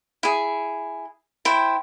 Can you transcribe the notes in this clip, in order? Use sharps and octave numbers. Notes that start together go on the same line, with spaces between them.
E4 G#4
E4 C5 G5